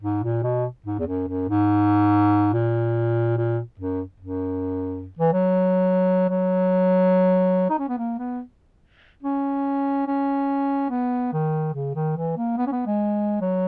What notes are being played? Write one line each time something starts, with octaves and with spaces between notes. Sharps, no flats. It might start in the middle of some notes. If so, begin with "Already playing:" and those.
G#2
A#2
B2
G#2
E2
F#2
F#2
G#2
A#2
A#2
F#2
F#2
E3
F#3
F#3
D#4
C#4
B3
A#3
B3
C#4
C#4
B3
D#3
C#3
D#3
E3
A#3
B3
C#4
B3
G#3
F#3